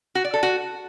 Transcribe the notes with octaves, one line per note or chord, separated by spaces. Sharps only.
F#4
D5
A4
F#4